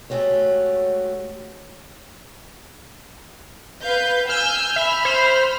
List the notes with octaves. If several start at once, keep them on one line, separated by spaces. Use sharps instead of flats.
G#3 A3 F#4 G4 C#5
B4 F5 G6
G#5 E6 F6 G6
E5 B5 F6
C5